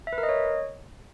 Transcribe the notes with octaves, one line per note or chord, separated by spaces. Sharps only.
E5
B4
A#4
D#5
C#5